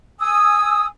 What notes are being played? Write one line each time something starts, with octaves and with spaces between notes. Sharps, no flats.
G#5 D#6 E6